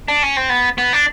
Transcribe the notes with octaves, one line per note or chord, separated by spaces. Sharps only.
D4
C#4
C4
B3
B3
D4